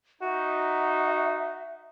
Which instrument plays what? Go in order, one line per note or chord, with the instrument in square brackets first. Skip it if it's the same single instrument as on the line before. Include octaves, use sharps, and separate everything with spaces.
[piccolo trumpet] D#4 [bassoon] F#4 [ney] E5